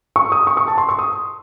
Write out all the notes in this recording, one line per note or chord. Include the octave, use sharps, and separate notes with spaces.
C#6
D#6
C#6
C#6
A5
C6
C#6
D#6